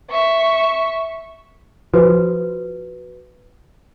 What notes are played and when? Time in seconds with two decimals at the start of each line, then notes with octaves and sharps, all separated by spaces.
0.10 E5 C#6
1.94 F3 F#4 B4